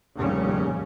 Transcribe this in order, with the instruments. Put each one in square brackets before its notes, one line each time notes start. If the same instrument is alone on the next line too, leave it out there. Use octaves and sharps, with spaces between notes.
[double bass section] F1 D#2 A2 C#3 G3 C#4